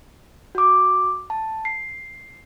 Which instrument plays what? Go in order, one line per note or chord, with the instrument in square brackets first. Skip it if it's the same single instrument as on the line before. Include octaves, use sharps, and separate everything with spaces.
[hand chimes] F#4 D6
A5
C7